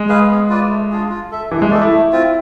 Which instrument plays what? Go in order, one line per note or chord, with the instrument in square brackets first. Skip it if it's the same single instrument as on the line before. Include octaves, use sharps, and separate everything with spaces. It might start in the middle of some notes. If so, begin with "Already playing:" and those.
Already playing: [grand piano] G#3
[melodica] G#4 B4 F5
B3
F4 B4 D5
A3
D4 F4 G#4
F4
A4 E5
[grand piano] E3 [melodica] D4
[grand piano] G#3
[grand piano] A3 [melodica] D5
[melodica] A4
[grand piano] E4
[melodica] A3
C4 F4